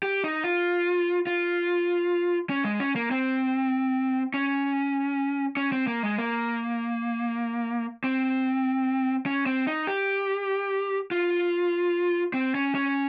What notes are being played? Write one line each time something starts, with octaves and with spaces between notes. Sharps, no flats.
G4
D#4
F4
F4
C#4
G#3
C#4
A#3
C4
C#4
C#4
C4
A#3
G#3
A#3
C4
C#4
C4
D#4
G4
F4
C4
C#4
C#4